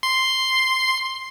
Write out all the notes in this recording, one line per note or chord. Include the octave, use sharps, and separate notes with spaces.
C6